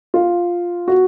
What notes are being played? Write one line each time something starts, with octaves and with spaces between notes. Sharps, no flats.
F4
F#4